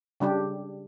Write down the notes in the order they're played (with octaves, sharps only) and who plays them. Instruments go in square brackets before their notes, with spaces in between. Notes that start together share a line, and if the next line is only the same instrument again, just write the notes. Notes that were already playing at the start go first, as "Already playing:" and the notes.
[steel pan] C#3 G3 D4 G4